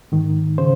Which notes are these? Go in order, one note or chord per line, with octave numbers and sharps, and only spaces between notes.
G#2 D#3
C#3 C5